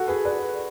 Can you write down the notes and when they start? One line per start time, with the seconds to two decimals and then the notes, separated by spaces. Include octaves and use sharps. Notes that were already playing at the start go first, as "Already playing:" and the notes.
Already playing: F#4 A4
0.08 G#4 B4
0.25 B4 D5